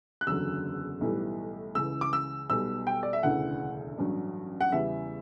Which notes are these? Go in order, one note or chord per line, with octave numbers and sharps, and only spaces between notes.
F#6
F#1 E2 D3 F#3 E6
B1 A2 E3 G3
C#2 C#3 E3 E6
D6
E6
B1 B2 G3 E6
G5
D5
E5
E1 D2 C#3 E3 F#5
A1 G2 F#3
F#5
E2 C#3 E3 G3 E5